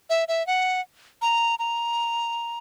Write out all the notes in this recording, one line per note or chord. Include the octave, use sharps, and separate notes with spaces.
E5
E5
F#5
A#5
A#5